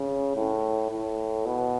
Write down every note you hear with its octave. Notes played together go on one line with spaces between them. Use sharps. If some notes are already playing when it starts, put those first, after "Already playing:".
Already playing: C#3
A2
A2
B2